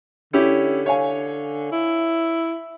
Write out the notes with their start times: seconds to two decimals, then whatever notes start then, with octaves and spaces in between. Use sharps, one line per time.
0.33 D3 C#4 E4 G4
0.86 C#5 F5 G#5
1.72 E4